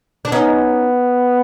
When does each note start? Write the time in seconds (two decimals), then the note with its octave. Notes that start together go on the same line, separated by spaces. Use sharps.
0.25 D4
0.32 B3 C#4 D#4